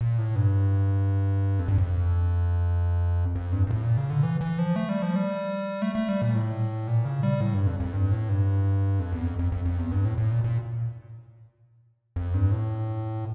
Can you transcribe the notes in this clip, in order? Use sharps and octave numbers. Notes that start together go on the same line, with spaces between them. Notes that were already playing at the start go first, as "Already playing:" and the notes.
A#2
A2
G2
F2
G2
F2
F2
G2
G2
A2
A#2
C#3
D3
E3
E3
F3
A3
G3
F3
G3
A3
A3
G3
A#2
A2
A#2
C#3
G3
A2
G2
F2
F2
G2
A2
G2
F2
E2
F2
F2
F2
F2
E2
G2
A2
A2
A#2
A#2
F2
G2
A2